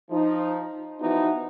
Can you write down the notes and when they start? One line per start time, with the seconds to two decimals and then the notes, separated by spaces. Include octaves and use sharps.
0.10 F3 D#4
1.00 E3 F3 B3 D#4 E4 F#4